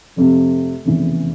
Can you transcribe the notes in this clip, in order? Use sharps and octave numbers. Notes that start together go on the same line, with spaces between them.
F1 F2 C3
F1 E2 C#3 E3